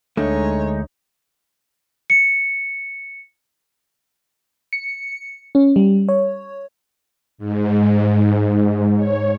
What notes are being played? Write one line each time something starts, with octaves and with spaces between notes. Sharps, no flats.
D2 D3 G#3 A3 D#4 C#5
C#7
C#7
C#4
G3
C#5
G#2
C#5